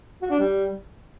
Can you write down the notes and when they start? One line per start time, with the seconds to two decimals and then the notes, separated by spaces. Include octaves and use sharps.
0.22 F#4
0.31 D4
0.39 G3